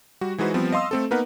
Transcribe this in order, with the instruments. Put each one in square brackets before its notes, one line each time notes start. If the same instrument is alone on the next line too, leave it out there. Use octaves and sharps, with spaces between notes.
[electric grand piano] G3 F#4
E3 G#3 D#4 F#4 B4 C5
F3 G3 B3 C4
D#5 F5 C6 D#6 E6
A3 C4 A4
A#3 B3 D#4 A#4 B4 F#5